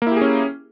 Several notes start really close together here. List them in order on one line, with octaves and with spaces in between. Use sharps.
A#3 E4 G4 G#4 C#4